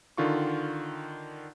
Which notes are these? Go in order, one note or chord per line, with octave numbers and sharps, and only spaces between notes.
D3 D#3 F4 C#6